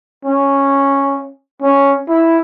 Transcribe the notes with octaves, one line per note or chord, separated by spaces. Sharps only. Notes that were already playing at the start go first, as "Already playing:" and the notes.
C#4
C#4
E4